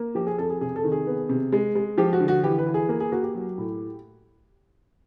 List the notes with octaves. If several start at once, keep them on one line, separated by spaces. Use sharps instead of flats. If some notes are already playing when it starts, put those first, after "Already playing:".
Already playing: A#3
F3 G4
G#4
F2 A4
G#4
C3 G#4
A4
D#3
G#4
B3
C3
G#3
G#3
F3 G4
F#4
D3
F#4
E3 G4
B4
E3
G#4
A#3 G#4
G#4
A#3 F#4
G4
F#3
A2